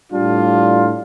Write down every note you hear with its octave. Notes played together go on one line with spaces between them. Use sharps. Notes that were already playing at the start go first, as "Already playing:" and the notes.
A2 G3 D4 F4